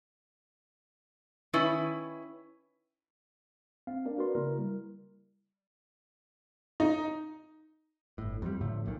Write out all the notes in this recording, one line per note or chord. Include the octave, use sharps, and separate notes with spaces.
D#3 C#4 E4 B4
C4 F5
A#3 D4 A#4 D5
F#4 A#4 B4 D5 C6
C#3 A#3 E4 A#4
G3
D#4
G1 A2
F2 G3
A2 D3 F3 A3
B1 A#2 D#3